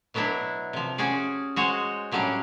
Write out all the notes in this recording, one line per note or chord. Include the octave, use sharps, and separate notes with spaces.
B2 F#3 B3 D4 E4
C3 F3
C#4 F#4 G#4 D5
G#3 F#4 C5 C#5
A2 F#3 G3 C#4 D4